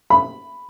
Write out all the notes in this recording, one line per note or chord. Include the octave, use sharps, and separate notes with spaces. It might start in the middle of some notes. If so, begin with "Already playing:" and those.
B5